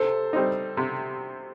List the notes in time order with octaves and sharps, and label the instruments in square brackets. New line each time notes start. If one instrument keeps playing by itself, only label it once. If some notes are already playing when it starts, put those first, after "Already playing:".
Already playing: [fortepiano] C3 [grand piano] A4 C5
[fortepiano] G3 C4 D#4
C3